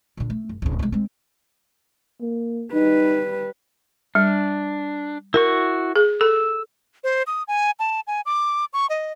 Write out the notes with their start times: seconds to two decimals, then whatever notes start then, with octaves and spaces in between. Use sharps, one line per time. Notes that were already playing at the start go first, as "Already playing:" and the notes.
0.17 A#2 D3
0.30 A3
0.49 F#1
0.62 D1 C#3
0.79 C3 G#3
0.92 G#3 C4
2.21 A#3
2.73 G3 D#4 B4
4.15 G3 D4
5.34 E4 F#4 A#4 C#6
5.96 G#4
6.21 A4 E6
7.04 C5
7.27 D#6
7.48 G#5
7.79 A5
8.07 G#5
8.26 D6
8.73 C#6
8.90 D#5